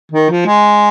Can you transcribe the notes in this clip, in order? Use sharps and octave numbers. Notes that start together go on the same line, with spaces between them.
D#3
F3
G#3